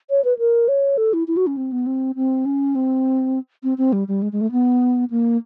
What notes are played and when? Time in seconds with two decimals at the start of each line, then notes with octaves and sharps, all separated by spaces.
0.10 C#5
0.24 B4
0.39 A#4
0.68 C#5
0.97 A4
1.13 E4
1.28 E4
1.37 F#4
1.47 C#4
1.57 C4
1.72 B3
1.87 C4
2.16 C4
2.45 C#4
2.75 C4
3.63 C4
3.78 C4
3.93 G3
4.08 G3
4.22 G#3
4.32 G#3
4.41 A3
4.52 B3
5.10 A#3